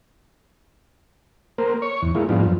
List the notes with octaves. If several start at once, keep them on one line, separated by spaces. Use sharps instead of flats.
A#3 A#4 C5
C#5 C#6
E2
G#3 A#3 E4 F4
G#2 F3 G3 B3 D4 F4
F#2 F3